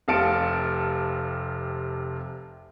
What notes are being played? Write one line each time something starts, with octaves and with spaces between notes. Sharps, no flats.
F1 C3 F5 A5 C#7 D7